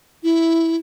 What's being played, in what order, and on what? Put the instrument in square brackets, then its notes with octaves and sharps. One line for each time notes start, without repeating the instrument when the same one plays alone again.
[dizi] E4